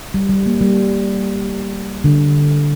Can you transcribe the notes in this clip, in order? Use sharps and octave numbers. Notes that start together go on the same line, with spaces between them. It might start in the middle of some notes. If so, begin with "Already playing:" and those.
G3
G3
A#3
G3
D3